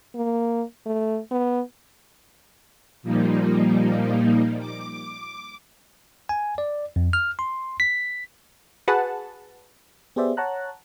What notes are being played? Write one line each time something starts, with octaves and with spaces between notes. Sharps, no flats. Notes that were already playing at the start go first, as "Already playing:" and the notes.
A#3
A3
B3
A#2 F3 G3 A#3 D#4
D6
G#5
D5
F2
F6
C6
B6
F#4 G#4 B4 F#5 A5
B3 G4 G#4 C5 D5 E5
C#5 F#5 A5 A#5 F#6